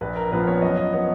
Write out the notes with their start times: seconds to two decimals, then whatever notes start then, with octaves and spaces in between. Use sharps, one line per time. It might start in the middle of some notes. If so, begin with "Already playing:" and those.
0.01 A#1 B4
0.16 A#4
0.31 A#2 F3 B3 B4
0.47 C#5
0.62 F#2 D#5
0.77 D#5
0.93 F3 B3 C#5